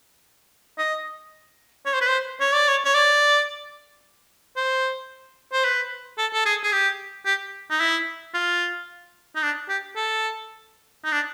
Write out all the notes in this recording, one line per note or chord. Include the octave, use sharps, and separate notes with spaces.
D#5
C#5
C5
B4
C5
C#5
D5
C#5
C#5
D5
C5
C5
B4
A4
A4
G#4
G#4
G4
G4
D#4
E4
F4
D#4
D4
G4
A4
D#4
D4